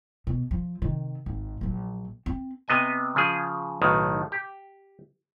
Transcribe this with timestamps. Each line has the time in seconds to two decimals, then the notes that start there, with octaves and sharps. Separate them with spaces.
0.27 B2
0.51 F3
0.82 C3 D#3
1.26 G#1
1.61 A#1 F#3
2.26 C4
2.68 C3 B3 D#5 G#5
3.16 C#3 F3 G#4
3.82 B1 A2 D#3
4.32 G4